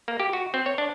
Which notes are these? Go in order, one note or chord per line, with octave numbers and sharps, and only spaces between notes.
A#3
G4
F#4
C4
C#5
D4